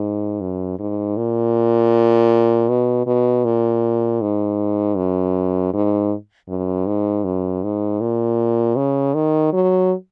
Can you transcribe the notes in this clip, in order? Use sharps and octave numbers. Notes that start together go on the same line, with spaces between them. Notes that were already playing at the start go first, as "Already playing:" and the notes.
Already playing: G#2
F#2
G#2
A#2
B2
B2
A#2
G#2
F#2
G#2
F#2
G#2
F#2
G#2
A#2
C#3
D#3
F#3